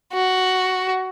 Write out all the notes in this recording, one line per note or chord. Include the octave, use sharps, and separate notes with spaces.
F#4